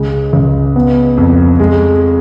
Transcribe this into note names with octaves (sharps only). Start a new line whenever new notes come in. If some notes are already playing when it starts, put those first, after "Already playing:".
Already playing: C#2 G#3
C#2
B3
F2
G#3